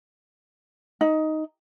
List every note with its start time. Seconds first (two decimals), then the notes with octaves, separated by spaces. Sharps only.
1.01 D#4